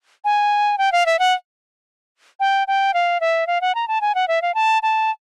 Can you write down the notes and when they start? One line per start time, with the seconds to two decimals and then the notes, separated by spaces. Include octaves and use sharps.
0.25 G#5
0.78 G5
0.92 F5
1.06 E5
1.19 F#5
2.40 G5
2.68 G5
2.94 F5
3.21 E5
3.47 F5
3.61 F#5
3.75 A#5
3.88 A5
4.01 G#5
4.15 F#5
4.28 E5
4.42 F5
4.55 A5
4.83 A5